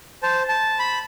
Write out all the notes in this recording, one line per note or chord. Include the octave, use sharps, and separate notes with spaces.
C5 A5
A5
B5